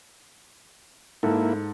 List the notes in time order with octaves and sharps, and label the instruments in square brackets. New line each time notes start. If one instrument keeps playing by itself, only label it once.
[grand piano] G#2 A4 [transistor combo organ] A#3 E4